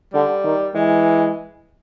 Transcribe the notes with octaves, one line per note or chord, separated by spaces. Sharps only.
D3 G3
D#3
E3 G#3